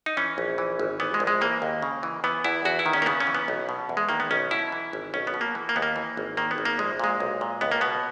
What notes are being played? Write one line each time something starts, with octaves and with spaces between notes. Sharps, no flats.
D#4
E3 C#4
A#1
E3
G#1
E3 B3
G#3
A#1
G#3
E3 A#3
D#2
C#3
E3
E3 B3
E2 E4
E2 F#4
E4
D#3
C#4
A#3
C#3 B3
C#4
E3
B3
B1
B2
E2
G#3
D#3 A#3
B3
B1 C#4
B2 E4
E3
G#1
B1 C#4
B3
B2
A#3
E3
A#3
D#2 B3
A#3
E3
G#1
D#3 A#3
B3
G#1
A#3
A#1 G#3
A#2 G#3
B1
A#2
C#2 B3
A#3
B2 B3